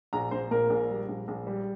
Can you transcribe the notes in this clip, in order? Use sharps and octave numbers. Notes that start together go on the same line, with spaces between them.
A#1 A#5
A#1 C5
A#2 A#4
A#1
G3
A#1
A#1
G3